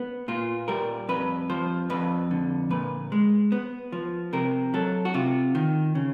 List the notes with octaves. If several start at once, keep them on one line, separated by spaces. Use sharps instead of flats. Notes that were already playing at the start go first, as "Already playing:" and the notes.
Already playing: B3
A#2 F4
G3 A#4
F2 B4
F3 C5
F2 B4
D3
A#2 B4
G#3
B3
F3
C3 A#4
F#3 A4
F#4
C3 F4
D#3
C#3